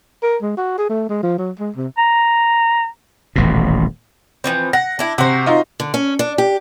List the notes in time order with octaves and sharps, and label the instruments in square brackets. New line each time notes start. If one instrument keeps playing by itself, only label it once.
[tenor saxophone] A#4
G#3
F#4
G#4
A3
G#3
F3
F#3
G#3
C3
[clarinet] A#5
[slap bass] D#1 A1 B2
[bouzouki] E3 F3 C4
[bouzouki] F#5 [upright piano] A#6
[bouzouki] D4 E4
[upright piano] C3 [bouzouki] F#4 C5
[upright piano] D#4 F4 D#5
[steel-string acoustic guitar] D3
C#4
D4
G4